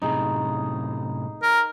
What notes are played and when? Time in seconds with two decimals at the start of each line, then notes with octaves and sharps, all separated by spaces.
0.02 F#2 A2 C3 D#4 G#4
1.42 A#4